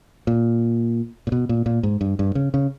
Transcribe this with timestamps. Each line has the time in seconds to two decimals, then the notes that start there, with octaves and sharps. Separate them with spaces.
0.27 A#2
1.27 A#2
1.32 B2
1.49 A#2
1.66 A#2
1.83 G#2
2.01 G2
2.19 G2
2.35 C#3
2.54 C#3